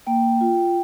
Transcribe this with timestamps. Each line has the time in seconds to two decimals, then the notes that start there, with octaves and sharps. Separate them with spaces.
0.07 A#3 G5
0.41 F4